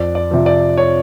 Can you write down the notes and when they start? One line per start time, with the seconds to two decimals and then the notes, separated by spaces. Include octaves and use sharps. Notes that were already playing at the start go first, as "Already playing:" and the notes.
Already playing: F2 D5
0.15 D5
0.31 C3 F3
0.46 D5
0.78 C#5